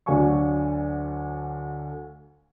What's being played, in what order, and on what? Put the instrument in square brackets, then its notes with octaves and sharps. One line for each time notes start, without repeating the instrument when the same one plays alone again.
[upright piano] D2 D3 F#3 F5 G#5 C#6